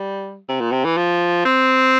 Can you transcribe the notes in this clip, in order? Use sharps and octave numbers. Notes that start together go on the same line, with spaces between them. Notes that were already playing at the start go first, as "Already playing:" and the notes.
Already playing: G3
C3
A#2
C3
E3
F3
C4